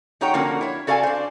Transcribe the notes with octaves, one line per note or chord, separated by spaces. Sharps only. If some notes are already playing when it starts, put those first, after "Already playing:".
G3 D#4 F#4 C#5 F#5 G5
D3 F3 A#3 C#4 F#4 F#5
E4 C#5
F#4 A4 D5 F5 G5 G#5
D4 C5